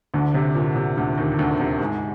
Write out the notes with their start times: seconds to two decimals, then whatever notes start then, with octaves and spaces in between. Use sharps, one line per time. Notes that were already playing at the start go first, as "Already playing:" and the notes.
0.14 D2 D3
0.34 C3
0.55 A#2
0.76 C3
0.97 D2 D3
1.17 D#2 D#3
1.39 D2 D3
1.60 C3
1.80 G#2 G#3